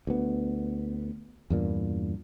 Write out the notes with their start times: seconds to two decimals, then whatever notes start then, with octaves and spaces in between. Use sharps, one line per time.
0.07 D2 B3
1.50 E2 G2 A#2